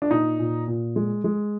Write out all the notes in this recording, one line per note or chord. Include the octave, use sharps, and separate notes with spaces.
D4
A#2 D#4
A#2
A#2
G#3
G#3